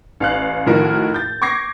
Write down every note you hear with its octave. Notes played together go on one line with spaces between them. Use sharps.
A1 F5 F#6
A2 D#3 F3 F#4 A#4
G6 A6
C#6 D6 G#6 A#6 C7